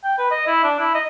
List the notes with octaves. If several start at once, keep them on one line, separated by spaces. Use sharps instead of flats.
G5
B4
D#5
E4
D4
E4
D#5